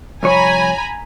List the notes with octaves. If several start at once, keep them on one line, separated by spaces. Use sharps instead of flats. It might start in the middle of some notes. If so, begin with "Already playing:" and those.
C2 F2 C#5 G#5 A#5 B5